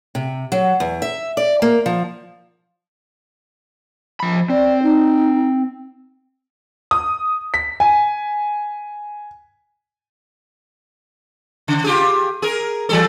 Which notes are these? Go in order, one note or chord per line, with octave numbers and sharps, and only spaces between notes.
C3
F#3
E2
E5
D5
A#3
F3
F3 B5
C4 D5
D#4
D#6
B6
G#5
C#3
F4 G4 G#4
G#4 A#4
E3 G3 A4